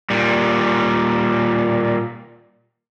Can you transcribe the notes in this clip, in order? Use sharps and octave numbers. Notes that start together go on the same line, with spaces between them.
A#2 G3